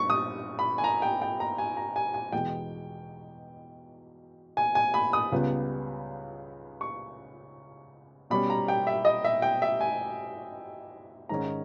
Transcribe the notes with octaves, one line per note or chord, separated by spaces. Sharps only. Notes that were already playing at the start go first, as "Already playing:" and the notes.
Already playing: G2 G3 C#6
D#6
B5
G#5
A#5
G5
G5
A#5
G#5
A#5
G#5
G#5
E2 B2 G#3 G5
G#5
G#5
B5
D#6
C#2 C#3 G3 B3
C#6
B2 G3 C#4 B5
A#5
G5
E5
D#5
E5
G5
E5
G#5
G#2 D#3 G#3 C#4 A#5